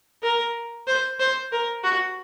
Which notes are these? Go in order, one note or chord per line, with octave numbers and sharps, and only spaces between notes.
A#4
C5
C5
A#4
F#4